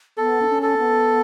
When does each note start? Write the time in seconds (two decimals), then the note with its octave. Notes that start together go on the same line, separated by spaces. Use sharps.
0.17 B3 A4
0.42 D4
0.48 C#4
0.62 A4
0.78 B3